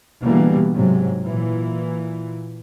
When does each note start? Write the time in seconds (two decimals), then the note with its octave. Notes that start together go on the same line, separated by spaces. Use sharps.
0.22 B2 D3 E3 G3 A#3
0.74 G#2 C3 F#3
1.24 A#2 E3